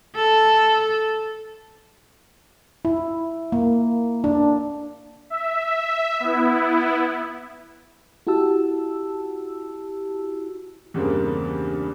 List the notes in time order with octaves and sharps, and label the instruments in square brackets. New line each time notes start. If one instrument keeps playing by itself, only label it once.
[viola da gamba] A4
[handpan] E4
A#3
D4
[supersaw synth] E5
B3 E4
[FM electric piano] E4 F#4 G4 A5 E6
[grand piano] E2 G2 C#3 A#3 C4